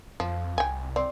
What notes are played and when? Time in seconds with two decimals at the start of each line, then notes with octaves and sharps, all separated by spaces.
0.20 F2 F3
0.58 C2 G5 G#5
0.96 C4 D5 C6